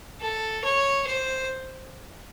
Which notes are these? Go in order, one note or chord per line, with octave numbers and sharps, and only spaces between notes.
A4
C#5
C5